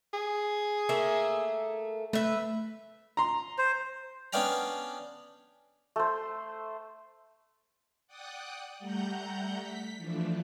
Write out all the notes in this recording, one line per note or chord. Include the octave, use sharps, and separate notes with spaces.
G#4
A3 A#3 E5
A3 B4 E5
A#5 C6
C5
B3 C#4 D4 F5 G5 A#5
A3 C5
D5 F#5 G5 D#6 F#6
G3 A3 F#5 A#5 G6
B6
E3 F3 A3 D4